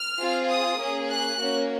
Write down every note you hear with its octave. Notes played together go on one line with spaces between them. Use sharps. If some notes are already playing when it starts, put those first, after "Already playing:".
Already playing: F6
C4 F4 G#4
D#6
A#3 C#4 G#4
F#6
A#3 C#4 F#4